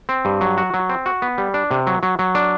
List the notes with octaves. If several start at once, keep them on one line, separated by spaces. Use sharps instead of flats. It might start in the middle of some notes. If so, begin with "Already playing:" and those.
C4
G2
F#3
F#4
F#3
C4
F#4
B3
G3
D4
C3
F#3
F#3
F#3
D4